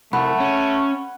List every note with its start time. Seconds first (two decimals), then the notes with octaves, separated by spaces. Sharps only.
0.13 C2 A3 F#5 B5
0.40 C#4